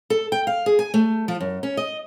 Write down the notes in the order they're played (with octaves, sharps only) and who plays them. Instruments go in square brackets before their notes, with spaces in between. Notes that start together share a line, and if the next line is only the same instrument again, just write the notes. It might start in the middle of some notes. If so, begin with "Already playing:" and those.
[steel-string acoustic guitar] A4
G5
F5
G#4
G#5
A3
F3
F#2
C#4
D#5